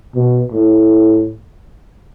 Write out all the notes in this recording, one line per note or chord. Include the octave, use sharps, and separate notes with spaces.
B2
A2